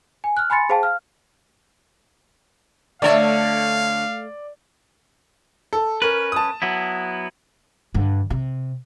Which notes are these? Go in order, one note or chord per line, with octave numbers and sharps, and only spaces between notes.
G#5
F6 F#6
G#5 B5 C6 A6 C#7
G#4 C5 F5 G5 A5
F5 F6
D3 A3 A4 C#5 D5 E5 F5
A4
C#4 A#4 B4
A5 D#6
F#3 B3 E4
G2 D3
C3